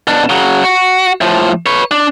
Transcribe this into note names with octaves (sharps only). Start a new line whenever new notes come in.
B2 D4
C#3 F#3
F#4
A2 F3
B4 C#5
D4